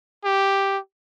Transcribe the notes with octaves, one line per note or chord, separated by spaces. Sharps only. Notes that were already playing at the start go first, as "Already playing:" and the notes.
G4